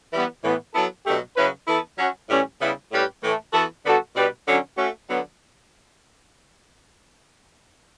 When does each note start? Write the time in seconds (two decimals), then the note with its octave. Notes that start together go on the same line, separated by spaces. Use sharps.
0.12 E3 G3 B3
0.43 A2 E3 B3
0.74 F#3 B3 E4 A4
1.05 B2 F#3 A3 D4 G4
1.36 C#3 F#3 C#4 E4 B4
1.67 E3 B3 E4 A4
1.98 F#3 C#4 F#4
2.29 A2 E3 G3 C#4 G4
2.60 C#3 G3 B3 E4
2.91 A2 G3 C#4 G4 B4
3.22 A2 E3 A3
3.53 E3 B3 F#4 A4
3.84 D3 G3 B3 F#4 A4
4.15 B2 G3 D4 G4 B4
4.46 D3 F#3 C#4
4.77 A3 C#4 F#4
5.08 D3 F#3 B3